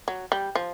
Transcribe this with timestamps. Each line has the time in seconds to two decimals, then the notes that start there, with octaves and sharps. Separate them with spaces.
0.08 F#3
0.32 G3
0.55 F3